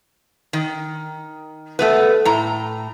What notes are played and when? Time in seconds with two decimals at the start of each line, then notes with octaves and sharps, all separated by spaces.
0.53 D#3
1.79 A3 B3 B4
2.25 A2 A#5